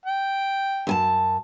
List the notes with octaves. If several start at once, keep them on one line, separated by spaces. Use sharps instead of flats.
G5
F#2 G#5 A5